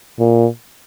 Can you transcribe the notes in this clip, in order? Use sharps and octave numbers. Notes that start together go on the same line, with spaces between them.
A#2